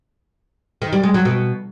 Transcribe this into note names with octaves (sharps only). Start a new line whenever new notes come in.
D#3
G3
G#3
F#3
B2